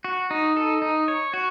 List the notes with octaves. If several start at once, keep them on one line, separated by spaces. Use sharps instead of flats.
F#4
D#4
A4
D#4
C#5
F#4